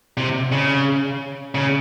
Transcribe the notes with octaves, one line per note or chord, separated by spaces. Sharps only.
C3
C#3
C#3